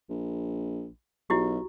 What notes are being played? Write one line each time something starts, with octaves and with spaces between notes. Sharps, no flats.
A#1
B1 E4 F#4 G4